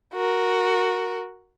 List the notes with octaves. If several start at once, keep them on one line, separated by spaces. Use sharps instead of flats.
F#4 A#4